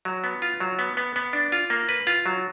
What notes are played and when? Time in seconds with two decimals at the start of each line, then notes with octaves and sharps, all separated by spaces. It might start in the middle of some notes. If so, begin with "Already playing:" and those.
0.05 F#3
0.24 B3
0.42 F4
0.60 F#3
0.79 B3
0.97 B3
1.16 B3
1.33 D4
1.52 F4
1.70 A#3
1.89 B4
2.07 F4
2.26 F#3